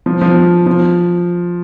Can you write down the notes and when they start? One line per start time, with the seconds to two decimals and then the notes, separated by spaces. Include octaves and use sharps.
0.06 F3
0.21 F3
0.66 F3